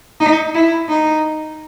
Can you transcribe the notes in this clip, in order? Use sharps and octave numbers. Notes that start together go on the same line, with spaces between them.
D#4
E4
D#4